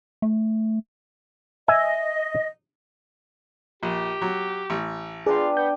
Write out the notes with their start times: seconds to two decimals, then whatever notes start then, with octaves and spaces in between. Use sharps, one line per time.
0.22 A3
1.68 D#5 E5 G#5
3.83 A#1 G4
4.22 F#3
4.70 A1
5.26 D4 F4 G#4 B4 G5
5.57 B3 G6